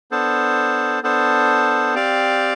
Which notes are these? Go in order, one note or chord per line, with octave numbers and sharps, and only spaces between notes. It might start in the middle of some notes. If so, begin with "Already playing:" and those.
B3 D4 A4 C5
B3 D4 A4 C5
C4 G4 D5 F5